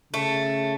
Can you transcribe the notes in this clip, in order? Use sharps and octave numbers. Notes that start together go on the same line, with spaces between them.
C#3 A3